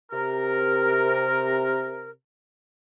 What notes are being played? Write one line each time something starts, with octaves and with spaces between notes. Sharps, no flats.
C3 A#4